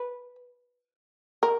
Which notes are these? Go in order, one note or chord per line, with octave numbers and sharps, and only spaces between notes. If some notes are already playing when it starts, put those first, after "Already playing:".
Already playing: B4
A#4